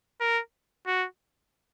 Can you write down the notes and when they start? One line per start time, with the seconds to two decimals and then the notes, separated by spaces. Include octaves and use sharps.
0.20 A#4
0.87 F#4